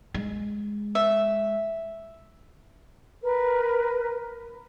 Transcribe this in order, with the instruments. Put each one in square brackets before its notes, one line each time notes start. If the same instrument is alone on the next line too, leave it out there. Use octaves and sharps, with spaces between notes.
[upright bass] G#3
[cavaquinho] E5
[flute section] A#4 B4